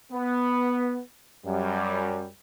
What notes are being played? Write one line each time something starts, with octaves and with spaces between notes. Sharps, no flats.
B3
F#2 G3